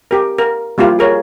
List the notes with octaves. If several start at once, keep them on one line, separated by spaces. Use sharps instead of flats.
G4 A#4
A#4
G3 A#3 E4 F4 G4
G#4 A#4 C#5